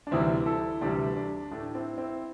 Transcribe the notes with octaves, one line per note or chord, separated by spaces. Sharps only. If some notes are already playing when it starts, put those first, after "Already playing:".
D4
D2 C3 E3 G3 C4 E4
E4 A4
D2 C3 E3 G3 D4 G4
D4
A2 A3 D4
C4 E4
C4 E4